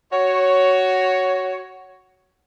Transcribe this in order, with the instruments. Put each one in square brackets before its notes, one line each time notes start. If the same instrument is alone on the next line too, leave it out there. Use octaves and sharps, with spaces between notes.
[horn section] F#4 C#5